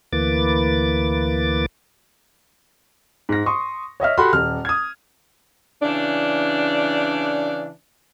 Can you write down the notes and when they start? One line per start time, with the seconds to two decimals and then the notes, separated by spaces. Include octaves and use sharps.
0.12 D2 E3 A#3 B4 D6 A6
3.29 G#2 A#6
3.46 C6 C#6 D#6
4.00 C#5 D#5 E5 F6
4.18 F#4 G4 A4 B5 C6
4.33 D#1 F6
4.65 D#6 G#6
5.82 C#3 E3 D4